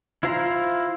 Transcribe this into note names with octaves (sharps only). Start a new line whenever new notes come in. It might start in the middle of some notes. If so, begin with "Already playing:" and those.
E4 F4 C5 F5 A#5